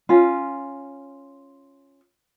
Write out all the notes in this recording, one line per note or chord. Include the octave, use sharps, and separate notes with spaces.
C#4 F4